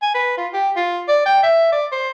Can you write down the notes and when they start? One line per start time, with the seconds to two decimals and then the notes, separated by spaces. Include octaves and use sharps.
0.02 G#5
0.14 B4
0.38 F4
0.53 G4
0.76 F4
1.08 D5
1.26 G5
1.43 E5
1.72 D5
1.92 C5